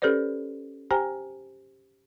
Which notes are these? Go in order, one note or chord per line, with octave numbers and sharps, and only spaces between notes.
C#4 G4 A4 B4 C5 D5
G4 C5 G5 G#5 A#5